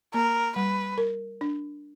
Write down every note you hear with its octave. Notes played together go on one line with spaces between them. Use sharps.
A#3 A#4
G3 B4
A#4
D4